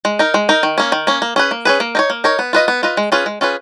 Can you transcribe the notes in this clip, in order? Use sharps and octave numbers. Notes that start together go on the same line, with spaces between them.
G#3
D#4 A#4
G#3
D#4 A#4
D#3
A#3 C#4
D#3
A#3 C#4
A#3
C#4 G#4 B4
A#3
C#4 G#4 B4
A#3
D#4 A#4 C#5
A#3
D#4 A#4 C#5
B3
F4 B4 D#5
B3
F4 B4 D#5
G#3
C#4 F4 G#4 B4
G#3
C#4 F4 G#4 B4